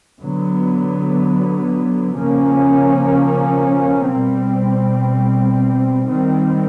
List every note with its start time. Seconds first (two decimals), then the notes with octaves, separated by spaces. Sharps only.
0.19 D3 F#3 B3
2.16 C#3 F3 A#3 C#4
4.12 B2 G3 C4
6.09 D#3 G3 C4